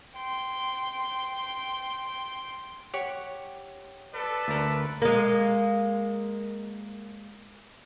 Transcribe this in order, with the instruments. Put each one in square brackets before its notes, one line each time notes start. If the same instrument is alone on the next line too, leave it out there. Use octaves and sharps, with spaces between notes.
[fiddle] G5 C6
[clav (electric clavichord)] G4 C#5 F#5
[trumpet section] A4 B4 D5
[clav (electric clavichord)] D2 A#4
[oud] G#3 A#3